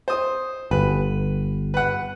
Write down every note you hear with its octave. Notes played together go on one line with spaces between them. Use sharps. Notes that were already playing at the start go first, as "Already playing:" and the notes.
C5 D#6
G1 B4
B4 F#5